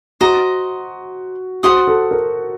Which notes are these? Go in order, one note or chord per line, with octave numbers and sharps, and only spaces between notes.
F#4 C5 D#5 A#5
F#4 C5 F#5 C6 D#6
A4
A#4